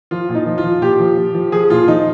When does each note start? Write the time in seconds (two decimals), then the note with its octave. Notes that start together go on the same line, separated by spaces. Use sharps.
0.11 F3 F4
0.29 A#2
0.35 D#4
0.46 F3
0.58 F4
0.64 F3
0.81 A#2 G4
0.99 F3
1.17 F3
1.34 F3
1.52 F3 G#4
1.70 A#2 F4
1.87 F3 D#4